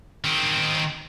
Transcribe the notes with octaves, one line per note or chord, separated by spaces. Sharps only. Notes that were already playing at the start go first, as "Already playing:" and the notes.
D#3 C4